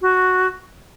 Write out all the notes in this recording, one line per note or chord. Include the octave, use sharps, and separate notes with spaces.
F#4